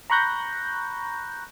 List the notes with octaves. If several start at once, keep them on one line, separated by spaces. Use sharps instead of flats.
A#5 B5 C#6 F#6 G6 A#6